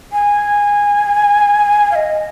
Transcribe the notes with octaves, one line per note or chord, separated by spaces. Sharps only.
G#5
F5
D#5